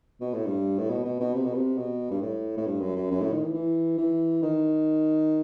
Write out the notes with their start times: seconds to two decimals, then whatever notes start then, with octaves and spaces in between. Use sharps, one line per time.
0.21 B2
0.34 A2
0.46 G2
0.79 A2
0.90 B2
1.05 B2
1.20 B2
1.35 C3
1.45 B2
1.55 C3
1.78 B2
2.11 G2
2.22 A2
2.57 A2
2.67 G2
2.81 F#2
2.96 F#2
3.11 F#2
3.21 A2
3.33 D#3
3.44 E3
3.54 E3
3.98 E3
4.43 D#3